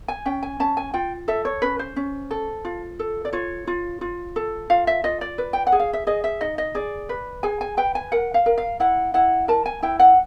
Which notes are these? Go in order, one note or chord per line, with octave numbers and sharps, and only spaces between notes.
G#5
C#4 G5
G#5
C#4 A5
G#5
F4 G5
A4 E5
C#5
C#4 B4
C5
C#4
A4
F4
A4
D5
F4 C#5
F4
F4
A4
F4 F5
E5
F4 D#5
D5
B4
G5
F#5
G#4
F5
E5
G#4 D#5
E5
D#4 D#5
D#5
G#4 D5
B4
G#4 G#5
G#5
B4 G5
G#5
A#4 F#5
F5
A#4
F5
E4 F#5
E4 F#5
A#4 A5
G#5
E4 G5
F#5